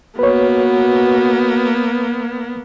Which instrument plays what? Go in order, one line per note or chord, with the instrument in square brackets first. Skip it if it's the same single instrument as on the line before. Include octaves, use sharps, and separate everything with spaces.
[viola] A#3 B3 [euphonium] F#4 [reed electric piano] B4 C#5